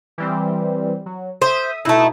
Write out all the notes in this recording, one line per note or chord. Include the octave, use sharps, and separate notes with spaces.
E3 G3 C4
F#3
C5 E5 D#6
B2 A3 D#4 E4